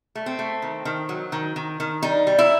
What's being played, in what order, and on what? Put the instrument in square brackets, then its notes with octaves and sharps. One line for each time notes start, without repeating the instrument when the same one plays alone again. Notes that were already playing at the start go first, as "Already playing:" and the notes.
[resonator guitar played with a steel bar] A3
C4
A3
D#3
D#3
F#3
D#3
D#3
D#3
G3 D#4
G3
E4